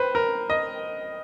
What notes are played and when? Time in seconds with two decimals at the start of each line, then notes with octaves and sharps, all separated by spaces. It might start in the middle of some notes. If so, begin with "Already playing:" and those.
Already playing: B4 C5
0.15 A#4
0.50 D#5